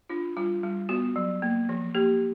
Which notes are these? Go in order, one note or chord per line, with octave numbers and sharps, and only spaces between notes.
D4 F4
G3 F4
G3
B3 F#4
F#3
A#3
F3
A#3 G4